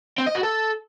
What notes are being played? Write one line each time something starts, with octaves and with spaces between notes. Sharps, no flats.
C4
D#5
F#4
A4